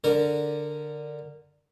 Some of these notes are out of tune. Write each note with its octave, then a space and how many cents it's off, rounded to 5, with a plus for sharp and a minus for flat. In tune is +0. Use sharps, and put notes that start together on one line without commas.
D3 +0 A#4 -15